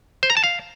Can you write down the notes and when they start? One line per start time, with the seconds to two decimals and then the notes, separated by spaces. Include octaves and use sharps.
0.23 C5
0.30 A#5
0.37 A5
0.44 F5